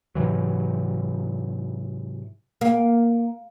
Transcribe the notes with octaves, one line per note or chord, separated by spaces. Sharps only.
G#2 C3 E3 F#3
A#3